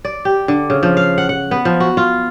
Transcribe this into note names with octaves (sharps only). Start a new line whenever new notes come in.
D5
G4
D3
C#3
F3
F5
F#5
F#5
B3
F3
F#4
F4